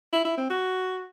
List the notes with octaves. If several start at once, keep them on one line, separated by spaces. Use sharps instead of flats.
E4
E4
C4
F#4